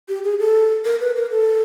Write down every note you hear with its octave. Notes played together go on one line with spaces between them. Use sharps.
G4
G#4
A4
A#4
B4
A#4
A4